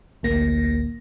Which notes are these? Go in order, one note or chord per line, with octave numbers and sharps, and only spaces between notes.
A1 D2 A#3 A#6